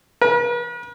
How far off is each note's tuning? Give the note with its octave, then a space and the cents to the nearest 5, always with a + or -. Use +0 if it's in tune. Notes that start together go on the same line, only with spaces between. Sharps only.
B4 -45